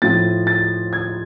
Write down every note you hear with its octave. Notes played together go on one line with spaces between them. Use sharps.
A2 F3 A6
A6
G#6